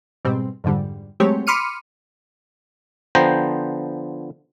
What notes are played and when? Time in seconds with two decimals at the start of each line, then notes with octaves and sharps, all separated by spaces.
0.25 G#2 B2 G3 C4
0.64 F2 G#2 D3 G3
1.20 F#3 G#3 A3 C4 G4 C#5
1.47 B5 C6 D6 F6 C#7 D#7
3.15 D3 F3 B3 C5 G5 A#5